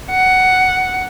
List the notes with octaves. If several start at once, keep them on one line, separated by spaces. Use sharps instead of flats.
F#5